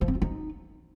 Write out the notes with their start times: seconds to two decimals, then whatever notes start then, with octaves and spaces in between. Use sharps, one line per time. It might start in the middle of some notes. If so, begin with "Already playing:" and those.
0.01 F3
0.08 C4
0.15 F4
0.22 D#4